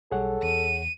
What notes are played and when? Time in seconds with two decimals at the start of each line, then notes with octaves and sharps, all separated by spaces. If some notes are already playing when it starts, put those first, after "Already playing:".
0.11 B1 G3 G#4 A4 C#5 F#5
0.43 E2 D#7